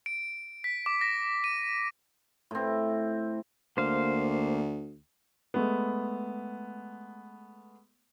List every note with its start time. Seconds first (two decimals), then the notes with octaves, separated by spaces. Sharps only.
0.06 D7
0.64 B6
0.86 D6
1.01 A#6
1.44 D#7
2.51 A2 C4
3.77 D2 A#3 C5 F5
5.54 G#3 A3 B3